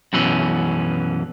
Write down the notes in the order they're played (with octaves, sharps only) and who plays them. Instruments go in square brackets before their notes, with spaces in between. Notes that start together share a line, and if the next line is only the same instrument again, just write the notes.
[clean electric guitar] F#2 B2 E3 C#4